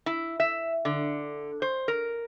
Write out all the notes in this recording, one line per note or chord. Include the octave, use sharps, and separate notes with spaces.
E4
E5
D3
C5
A#4